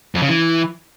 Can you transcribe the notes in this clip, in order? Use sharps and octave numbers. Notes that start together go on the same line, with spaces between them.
F2
C#3
E3